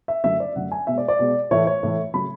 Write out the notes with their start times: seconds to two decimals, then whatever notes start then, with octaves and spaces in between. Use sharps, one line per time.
0.08 E5
0.24 F#2 D3 F#3 A3 E5
0.40 D5
0.56 F#2 D3 F#3 A3 F#5
0.72 G#5
0.87 B2 G#3 E5
0.98 D5
1.08 D5
1.19 B2 G#3
1.51 A2 E3 A3 C#5
1.67 C#5
1.83 A2 E3 A3
2.14 C#3 F#3 A3 B5